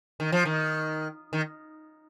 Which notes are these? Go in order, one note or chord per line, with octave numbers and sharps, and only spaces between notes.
D#3
F3
D#3
D#3